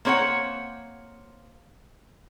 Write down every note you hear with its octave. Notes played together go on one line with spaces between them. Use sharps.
A#3 C4 C#5 D#5 F#5